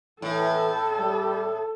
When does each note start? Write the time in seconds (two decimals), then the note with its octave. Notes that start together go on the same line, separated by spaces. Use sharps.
0.22 A2 E3 A4
0.97 G3